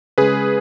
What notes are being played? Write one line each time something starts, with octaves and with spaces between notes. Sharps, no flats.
C#3 G#3 G#4 B4